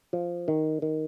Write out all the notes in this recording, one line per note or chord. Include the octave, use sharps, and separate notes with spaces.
F3
D#3
D#3